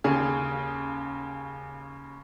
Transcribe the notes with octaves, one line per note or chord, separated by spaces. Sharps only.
D#2 C#3 G#4